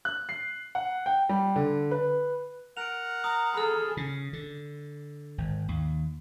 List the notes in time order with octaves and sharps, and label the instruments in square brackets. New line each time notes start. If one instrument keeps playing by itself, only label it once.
[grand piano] F#6
C7
F#5
G5
G3
D3
B4
[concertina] A#4 F#5 [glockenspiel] D7 F7
[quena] A#5 [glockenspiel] D#6
[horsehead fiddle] G#4 A4 [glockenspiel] B5 F6
[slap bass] C#3
D3
G#1
D#2